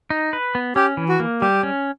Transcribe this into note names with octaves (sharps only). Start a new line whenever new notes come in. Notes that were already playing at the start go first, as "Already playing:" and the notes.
D#4
B4
B3
C#4 G4
E3
F#4
A#3
G3 G4
C#4